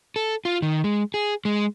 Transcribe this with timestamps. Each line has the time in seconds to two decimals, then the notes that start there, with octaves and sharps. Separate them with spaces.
0.16 A4
0.45 F4
0.62 D#3
0.84 G#3
1.14 G#4
1.45 G#3